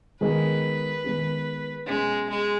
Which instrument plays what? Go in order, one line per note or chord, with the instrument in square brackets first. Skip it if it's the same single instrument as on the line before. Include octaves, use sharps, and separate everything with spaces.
[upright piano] D#3 G#3 B3 G#4 [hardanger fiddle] B4
[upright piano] D#3 G#3 B3 G#4
[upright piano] B2 F#3 C#4 [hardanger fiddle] G#3
[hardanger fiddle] G#3